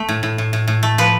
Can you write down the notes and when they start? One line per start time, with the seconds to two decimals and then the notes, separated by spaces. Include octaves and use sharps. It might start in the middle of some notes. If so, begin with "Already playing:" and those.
Already playing: A3
0.09 A2
0.23 A2
0.38 A2
0.53 A2
0.68 A2
0.83 A3
0.98 F3 B4